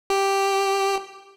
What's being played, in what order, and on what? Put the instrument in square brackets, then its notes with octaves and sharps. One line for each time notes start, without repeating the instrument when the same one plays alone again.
[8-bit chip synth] G4